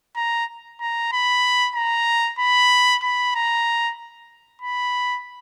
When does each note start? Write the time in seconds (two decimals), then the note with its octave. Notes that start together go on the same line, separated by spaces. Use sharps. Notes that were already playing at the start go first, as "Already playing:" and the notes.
0.16 A#5
0.80 A#5
1.12 B5
1.76 A#5
2.39 B5
3.03 B5
3.35 A#5
4.62 B5